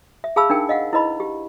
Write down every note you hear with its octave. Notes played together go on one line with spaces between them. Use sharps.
E5
G#4 F5 A5 B5 E6
D4 D#4 A#4 G5
D#5 F5 F#5
E4 B4 D#5 B5
G4